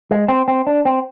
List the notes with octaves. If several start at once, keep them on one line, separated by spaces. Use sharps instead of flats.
G#3
C4
C4
D4
C4